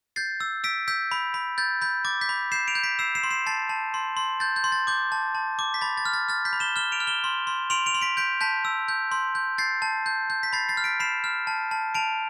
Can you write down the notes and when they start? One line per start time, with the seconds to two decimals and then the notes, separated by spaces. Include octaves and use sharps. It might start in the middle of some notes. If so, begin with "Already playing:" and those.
0.16 G6 A6 C7
0.40 E6
0.64 E6 B6 D7
0.88 E6 G6 B6
1.11 B5
1.34 B5
1.58 G6 A6
1.82 B5 G6
2.05 D6 A6
2.21 G6 B6
2.29 B5
2.52 G6 C7 E7
2.68 D7 F7
2.75 G6
2.83 B6 D7
2.99 E6 C7 E7
3.15 C7 E7
3.23 C6
3.31 C7 E7
3.46 A5 A6 C7
3.69 A5
3.94 C6
4.17 C6
4.40 G6 A6
4.56 G6
4.64 C6
4.72 A6
4.87 D6 G6
5.12 A5
5.35 A5
5.59 D6
5.74 B6
5.81 B5 A6
5.97 A6
6.05 F6
6.13 A6
6.29 F6 A6
6.45 G6 B6
6.53 B5
6.60 E7 G7
6.76 F6 E7 G7
6.92 D7 F7
7.00 F6
7.07 E7 G7
7.24 C6
7.47 C6
7.70 C6 D7 F7
7.86 D7 F7
7.94 C6
8.02 B6 D7
8.17 G6 B6 D7
8.41 A5 G6 B6
8.65 E6
8.88 G6
9.12 C6
9.35 G6
9.58 G6 A6 C7
9.82 A5
10.06 G6
10.30 G6
10.43 B6
10.53 B5 A6 C7
10.69 A6 C7
10.77 F6
10.84 B6 D7
11.00 B5 C7 E7
11.24 F6
11.47 A5
11.71 A5
11.94 A5 D7 F7